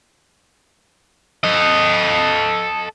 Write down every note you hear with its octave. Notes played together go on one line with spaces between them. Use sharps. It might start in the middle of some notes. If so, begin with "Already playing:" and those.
A4 D#5